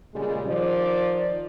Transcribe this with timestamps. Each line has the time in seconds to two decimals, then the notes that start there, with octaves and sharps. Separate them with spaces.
0.14 A#2 C#3 G3 G#3
0.47 D#3 F3 D5